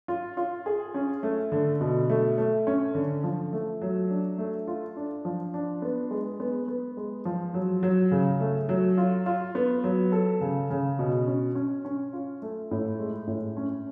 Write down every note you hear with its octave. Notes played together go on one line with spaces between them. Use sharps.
F4
F4
G#4
C#4
A3
D3
B2
A3
A3
C#4
D3
F3
A3
F#3
D4
A3
F4
D4
F3
D4
B3
G#3
B3
B3
G#3
F3
F#3
F#3
C#3
A3
F#3
F4
F4
B3
F#3
A4
C#3
C#3
B2
C#4
C#4
C#4
F4
A3
A2
G#3
A2
C#4